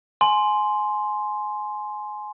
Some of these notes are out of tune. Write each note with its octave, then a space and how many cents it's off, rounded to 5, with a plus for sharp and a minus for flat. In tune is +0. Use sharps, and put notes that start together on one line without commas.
G#5 +20 C6 +0